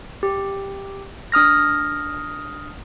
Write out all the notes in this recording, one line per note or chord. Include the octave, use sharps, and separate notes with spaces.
G4
D4 D#6 F6 A#6